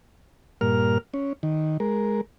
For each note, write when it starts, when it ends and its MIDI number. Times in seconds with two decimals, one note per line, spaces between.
0.61 0.98 43
0.61 0.98 46
0.61 0.98 70
0.61 0.98 89
1.14 1.33 61
1.43 1.77 51
1.80 2.21 56
1.80 2.21 70